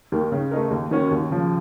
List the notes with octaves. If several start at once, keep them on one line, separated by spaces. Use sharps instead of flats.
D#2 D#3 A#3
C#3
A3 D#4 A#4
D#2
D#3 A#3 C#4 F#4
D#2
C#3 F3